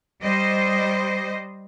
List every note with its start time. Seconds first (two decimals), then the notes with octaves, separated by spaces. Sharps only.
0.22 G3 C5 D#5